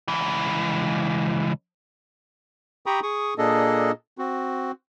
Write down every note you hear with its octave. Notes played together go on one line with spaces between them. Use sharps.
C#2 E3
G4 G5 A#5 B5 C#6 D#6
G#4 C#6 D#6
A#2 A#3 D4 G#4 A4 D#5
C4 F#4